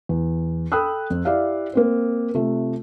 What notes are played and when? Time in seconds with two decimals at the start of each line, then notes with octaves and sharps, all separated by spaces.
0.09 E2
0.72 A4 G5 B5 D#6 E6 F#6
1.10 F2
1.25 E4 G4 D5 E5 F5
1.73 A#3 C4 C5
2.34 C3 A3 F4